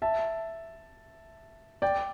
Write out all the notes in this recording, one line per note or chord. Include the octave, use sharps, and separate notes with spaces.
E5 A5
D5 G5